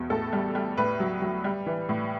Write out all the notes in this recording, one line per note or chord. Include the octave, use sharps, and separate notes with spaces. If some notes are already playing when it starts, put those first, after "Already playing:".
Already playing: E2 B2
A2 A4
G3
G3
A2 B4
F#3
F#3
G3
E3
A2